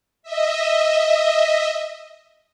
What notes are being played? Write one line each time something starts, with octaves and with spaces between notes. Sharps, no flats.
D#5 E5